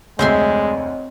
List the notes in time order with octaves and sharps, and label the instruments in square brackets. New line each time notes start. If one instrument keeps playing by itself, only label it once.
[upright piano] F1 D2 [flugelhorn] G#3 [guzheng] C4 E5 C6 [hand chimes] C#5 D#5